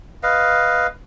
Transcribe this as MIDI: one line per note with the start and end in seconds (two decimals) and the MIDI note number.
0.23 0.87 71
0.23 0.87 75
0.23 0.87 77